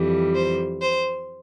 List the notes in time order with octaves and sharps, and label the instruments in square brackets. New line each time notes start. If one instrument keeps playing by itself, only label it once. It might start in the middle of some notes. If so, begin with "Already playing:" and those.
Already playing: [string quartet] F2 E3 G3
C5
C5